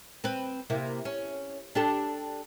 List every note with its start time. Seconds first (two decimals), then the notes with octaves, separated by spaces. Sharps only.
0.24 C4 B4
0.70 C3 A#3 E4
1.05 C#4
1.75 D4 G4 A4